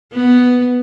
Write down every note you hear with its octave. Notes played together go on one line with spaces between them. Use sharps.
B3